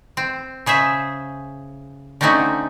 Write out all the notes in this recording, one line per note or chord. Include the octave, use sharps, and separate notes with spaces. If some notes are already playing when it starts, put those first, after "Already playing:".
C4
C#3 G#4 C5 E5
D3 A3 C4 C#4 D#4 F#4